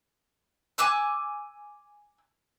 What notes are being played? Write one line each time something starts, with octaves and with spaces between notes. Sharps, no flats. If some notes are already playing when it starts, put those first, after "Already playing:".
G#5 D6 E6 F#6